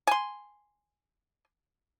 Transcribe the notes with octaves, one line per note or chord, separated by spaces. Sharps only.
G#5 C6